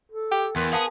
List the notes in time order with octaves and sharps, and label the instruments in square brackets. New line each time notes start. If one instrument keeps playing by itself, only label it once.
[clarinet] A4
[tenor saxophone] G4 [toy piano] G5
[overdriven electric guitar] E2 [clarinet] A#4 [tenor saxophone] B4 [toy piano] C6
[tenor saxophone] B3 [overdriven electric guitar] G#4 [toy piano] F5 A5 D#6